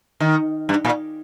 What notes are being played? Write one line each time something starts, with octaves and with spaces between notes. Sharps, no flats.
D#3
G2
A#2